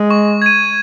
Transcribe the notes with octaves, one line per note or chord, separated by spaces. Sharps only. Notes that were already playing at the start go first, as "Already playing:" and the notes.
Already playing: G#3
C#6
G#6 D#7